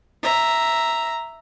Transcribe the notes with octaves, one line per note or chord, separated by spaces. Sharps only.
E5 A#5